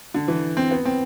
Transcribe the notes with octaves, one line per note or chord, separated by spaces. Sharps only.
D3
E3
C4
B3
C4